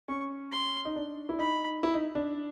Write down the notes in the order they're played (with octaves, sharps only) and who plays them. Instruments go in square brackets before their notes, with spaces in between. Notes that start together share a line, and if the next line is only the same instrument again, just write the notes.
[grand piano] C#4 [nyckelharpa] C#6
[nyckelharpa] C6
[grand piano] D#4
D4
E4
[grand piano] D#4 [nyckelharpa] B5
[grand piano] E4
D#4
D4